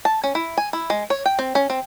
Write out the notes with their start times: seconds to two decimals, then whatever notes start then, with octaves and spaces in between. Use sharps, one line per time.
0.05 A5
0.24 C#4
0.35 E4
0.58 G#5
0.73 E4
0.90 G#3
1.10 C#5
1.26 G5
1.39 C4
1.55 C#4
1.70 C4